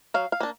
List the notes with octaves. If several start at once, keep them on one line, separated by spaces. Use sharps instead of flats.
F#3 F5
F5
A#3 D4